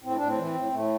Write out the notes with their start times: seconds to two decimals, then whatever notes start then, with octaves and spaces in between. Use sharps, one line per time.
0.03 A2 C4
0.16 D4
0.21 A2
0.27 C4
0.38 E3
0.55 A2
0.73 A2 A3